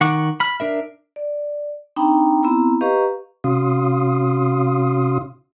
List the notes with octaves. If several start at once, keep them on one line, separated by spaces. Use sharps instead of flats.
D#3 F#5 C#6 D6
B5 F6
D4 A#4 E5
D5
C4 D4 D#4 G5 A#5 B5
B3 C4 E4 A#5 B5
G4 B4 D#5 F5 A#5 C#6
C3 C#4 F#4 F5 C6 D#6